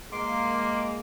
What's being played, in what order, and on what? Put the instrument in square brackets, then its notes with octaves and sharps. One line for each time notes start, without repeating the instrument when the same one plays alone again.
[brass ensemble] G#3 A#3 [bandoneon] C6 D6